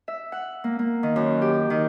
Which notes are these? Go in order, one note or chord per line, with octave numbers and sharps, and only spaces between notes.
E5
F#5
A#3
A#3
D#3
F#2
G4
D#3